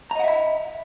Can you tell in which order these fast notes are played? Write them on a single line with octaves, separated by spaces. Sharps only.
A#5 D#5 F#5 E5 B5